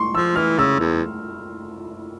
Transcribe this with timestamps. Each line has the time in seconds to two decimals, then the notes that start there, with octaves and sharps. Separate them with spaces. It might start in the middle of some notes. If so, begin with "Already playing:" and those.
Already playing: C6 C#6
0.15 F3 E6
0.36 E3 F6
0.58 C#3 E6
0.79 E2